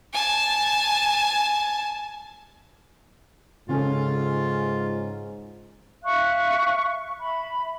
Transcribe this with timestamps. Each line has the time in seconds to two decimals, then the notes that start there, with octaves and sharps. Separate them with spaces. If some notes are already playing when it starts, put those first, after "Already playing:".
0.13 G#5 A5
3.69 G#2 C#3 C#4 F4 A4
6.04 E5 F5 C#6 F#6
7.19 E5 B5